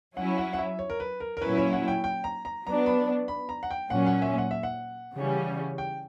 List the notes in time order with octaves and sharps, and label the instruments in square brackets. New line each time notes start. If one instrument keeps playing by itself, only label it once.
[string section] F#3 C#4 E4 [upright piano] F#5
[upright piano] F#5
F#5
E5
C#5
A#4
B4
A#4
A#4
[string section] A#2 F#3 C#4 E4 [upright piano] B4
[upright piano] C#5
F#5
G5
G5
A#5
A#5
[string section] F#3 B3 D4 [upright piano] A#5
[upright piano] B5
B5
A#5
F#5
G5
[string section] A#2 F#3 C#4 [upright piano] F#5
[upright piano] F#5
E5
F#5
E5
F#5
[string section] C#3 E3 G3 C#4
[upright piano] G5